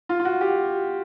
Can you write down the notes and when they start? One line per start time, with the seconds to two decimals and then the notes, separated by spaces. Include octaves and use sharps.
0.09 F4
0.20 F4
0.25 F#4
0.41 G4